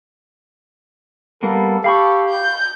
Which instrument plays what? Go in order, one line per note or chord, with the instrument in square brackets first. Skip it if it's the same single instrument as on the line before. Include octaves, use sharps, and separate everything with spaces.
[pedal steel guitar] G3 A#3 B3 [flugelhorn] A4
[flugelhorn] G4 [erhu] A4 [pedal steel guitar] F5 B5 C#6
[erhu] G6